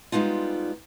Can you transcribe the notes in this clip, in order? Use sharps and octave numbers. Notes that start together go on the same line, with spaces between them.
G3 G#3 B3 D#4 F4